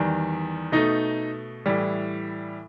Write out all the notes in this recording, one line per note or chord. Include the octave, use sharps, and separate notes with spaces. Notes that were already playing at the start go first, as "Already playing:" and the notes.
Already playing: E2 D#3 G3
B2 A3 D#4 D#5
A2 E3 G3